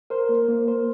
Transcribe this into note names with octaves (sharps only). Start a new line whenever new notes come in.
A#4 C5
A#3
A#3
C5